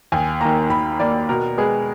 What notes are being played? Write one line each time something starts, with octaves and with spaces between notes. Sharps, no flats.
D#2 G#5
D#3 A#3 A#5
D#2 B5
D#3 A#3 D5
B2 A#4
G#3 B3 G#4